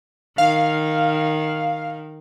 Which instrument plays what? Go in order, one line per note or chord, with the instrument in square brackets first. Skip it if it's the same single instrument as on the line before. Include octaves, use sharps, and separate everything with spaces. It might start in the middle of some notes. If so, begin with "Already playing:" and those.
[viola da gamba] D#3 [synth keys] F5